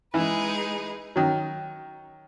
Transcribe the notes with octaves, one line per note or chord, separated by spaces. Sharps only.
E3 G#3 D#4 G#4 B4
D#3 F#3